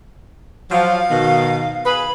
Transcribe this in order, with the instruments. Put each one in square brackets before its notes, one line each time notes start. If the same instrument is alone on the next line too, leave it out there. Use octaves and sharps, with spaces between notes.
[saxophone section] F3 F#3 [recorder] F5
[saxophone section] B2 D#3
[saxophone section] G#4 B4 [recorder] B5